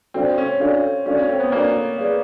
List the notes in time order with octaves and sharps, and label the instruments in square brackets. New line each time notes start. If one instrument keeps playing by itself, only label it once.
[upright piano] C4 [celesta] D4 F#4 A4 D5 F5
[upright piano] C#4
[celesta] D4 F#4 A4 D5 F5
[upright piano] C#4 [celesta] D4 F#4 A4 D5 F5
[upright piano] C#4
C4
B3
[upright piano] A#3 [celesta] D4 F#4 A4 D5 F5
[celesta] G#4 B4 D5 F5